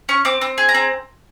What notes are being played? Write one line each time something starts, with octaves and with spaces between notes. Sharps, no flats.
C#4 C#6
C4 D6
C4
G#4
A#5
C4